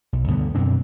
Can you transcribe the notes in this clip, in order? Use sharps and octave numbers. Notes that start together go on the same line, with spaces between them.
B1
D2 G2 D3 B3
F#2 B2 C4 D4